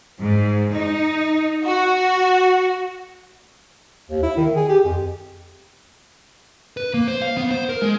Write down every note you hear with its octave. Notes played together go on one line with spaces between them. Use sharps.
G#2
D#4
F#4
D#2
E4
D#3
G#4
G4
F2
B4
A#3
C5
F5
B3
C5
A#4
G#3